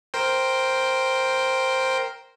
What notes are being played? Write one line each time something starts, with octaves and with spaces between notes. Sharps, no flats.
A#4 C5 G5